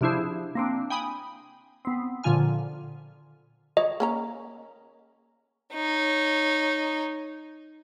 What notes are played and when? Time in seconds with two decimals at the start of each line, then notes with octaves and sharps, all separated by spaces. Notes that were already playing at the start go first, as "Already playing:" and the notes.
0.01 C3 F3 D4 E4 G#4 C5
0.55 A#3 C4 D4
0.90 G5 G#5 B5 D#6
1.85 B3 C4
2.24 A#2 D3 F3 F4 G#5 F6
3.77 C#5 D#5
4.00 A#3 C#4 A#5
5.74 D#4 C#5